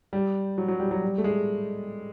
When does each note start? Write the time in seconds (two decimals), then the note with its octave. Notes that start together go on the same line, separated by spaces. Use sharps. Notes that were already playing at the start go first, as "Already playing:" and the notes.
0.13 G3
0.58 F#3
0.68 F#3
0.80 G3
0.91 F#3
1.02 G3
1.18 A3
1.24 G#3